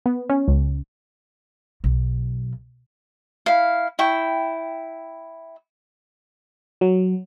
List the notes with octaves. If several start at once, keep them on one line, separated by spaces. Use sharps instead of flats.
B3
C#4
C#2
B1
E4 F5
E4 G5 C#6
F#3